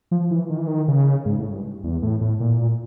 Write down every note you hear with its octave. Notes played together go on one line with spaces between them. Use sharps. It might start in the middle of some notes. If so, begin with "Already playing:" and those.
F3
E3
D#3
E3
D#3
C#3
G#2
A2
G2
E2
A2
A2
A#2